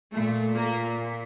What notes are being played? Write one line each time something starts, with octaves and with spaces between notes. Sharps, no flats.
A#2 A3
A#3